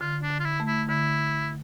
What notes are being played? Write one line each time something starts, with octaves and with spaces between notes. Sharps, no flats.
D3 F4
D4
D3
F4
E4
A3
E4
D3 E4
D3